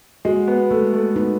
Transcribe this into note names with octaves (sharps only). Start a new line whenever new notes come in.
G#3 F#4
B3
G#3 A3
A3
B3 D#4